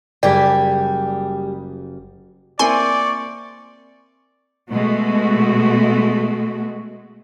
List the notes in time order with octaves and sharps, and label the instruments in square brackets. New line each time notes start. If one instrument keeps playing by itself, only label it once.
[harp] F#1 G4 B6 [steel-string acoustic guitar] G3 G#4 [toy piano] D5 [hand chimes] G5
[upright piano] A#3 C4 E4 [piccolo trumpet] D5 [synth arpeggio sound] G#5 C6 [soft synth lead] C#6
[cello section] B2 G#3 A3 F#4